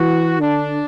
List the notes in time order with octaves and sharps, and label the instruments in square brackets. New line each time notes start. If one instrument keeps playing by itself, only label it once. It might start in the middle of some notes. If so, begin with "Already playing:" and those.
Already playing: [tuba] E3 [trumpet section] F#4
[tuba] D3 [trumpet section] D4